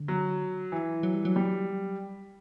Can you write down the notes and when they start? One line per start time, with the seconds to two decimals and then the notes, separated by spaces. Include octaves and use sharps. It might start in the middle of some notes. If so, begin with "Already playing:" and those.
Already playing: D3
0.08 F#3
0.72 E3
1.03 F#3
1.14 G3
1.25 F#3
1.36 G3